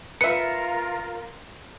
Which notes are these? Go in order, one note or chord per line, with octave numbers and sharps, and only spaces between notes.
F4 A#4 B4 E5 C#7